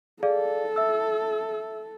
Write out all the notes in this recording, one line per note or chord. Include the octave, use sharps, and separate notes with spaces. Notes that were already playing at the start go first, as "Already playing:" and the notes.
G#4 A4 D5 F5
E5 E6